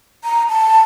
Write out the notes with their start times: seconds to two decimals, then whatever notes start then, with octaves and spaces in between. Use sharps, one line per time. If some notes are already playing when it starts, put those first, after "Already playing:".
0.24 A#5
0.49 A5